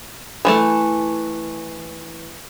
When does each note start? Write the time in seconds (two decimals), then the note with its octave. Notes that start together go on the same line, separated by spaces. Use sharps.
0.45 E3 G3 A3